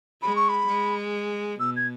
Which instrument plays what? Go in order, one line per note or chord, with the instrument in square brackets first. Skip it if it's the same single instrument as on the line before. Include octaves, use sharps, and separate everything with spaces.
[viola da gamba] G#3 [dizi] B5
[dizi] C#6
B5
[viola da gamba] G#3
[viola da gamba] B2 [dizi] E6
[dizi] G#6